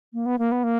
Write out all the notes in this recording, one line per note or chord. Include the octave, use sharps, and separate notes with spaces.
A#3
B3
A#3
B3
A#3